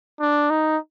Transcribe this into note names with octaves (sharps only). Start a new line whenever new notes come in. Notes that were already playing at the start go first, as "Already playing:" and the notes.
D4
D#4